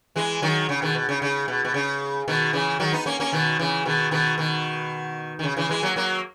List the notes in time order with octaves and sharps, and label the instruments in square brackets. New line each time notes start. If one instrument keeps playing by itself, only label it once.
[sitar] E3 G#3
D#3 F#3
C#3
B2 D#3
B2
C#3
C#3
B2
B2
C#3
B2 D#3
C#3 E3
D#3 F#3
B3 D#4
A#3 C#4
A#3 C#4
B2 D#3
C#3 E3
B2 D#3
B2 D#3
B2 D#3
D#3
C#3
C#3 E3
E3 G#3
F#3 A#3
F#3 A#3